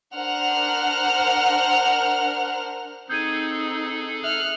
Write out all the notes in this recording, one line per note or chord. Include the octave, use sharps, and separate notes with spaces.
D4 A#4 C5 F#5 F6
C4 D#4 G#4 A4 G6 G#6 D#7
E5 F6 F#6